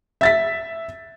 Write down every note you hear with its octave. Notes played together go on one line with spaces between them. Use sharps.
E5 A6 B6